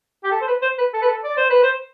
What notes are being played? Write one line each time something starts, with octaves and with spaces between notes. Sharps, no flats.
G4
A4
C5
B4
C5
B4
A4
B4
A4
D5
C5
B4
C5